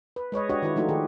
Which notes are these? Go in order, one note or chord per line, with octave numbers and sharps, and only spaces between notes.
B4
G#3 B4 C#5 D#5
D4 F#4 G4 C#5 D#5 F#5
D#3 E4 F#4 B4
F3 A3 D#4 F4 F#4
D#3 G4 G#4